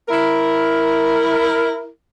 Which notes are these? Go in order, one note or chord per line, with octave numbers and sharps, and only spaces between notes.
E4 A#4